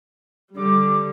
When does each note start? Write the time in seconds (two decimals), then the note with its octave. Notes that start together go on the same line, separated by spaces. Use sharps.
0.56 D3 G3 D6